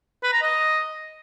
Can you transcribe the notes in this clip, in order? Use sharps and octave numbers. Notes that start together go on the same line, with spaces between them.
B4
A#5
D#5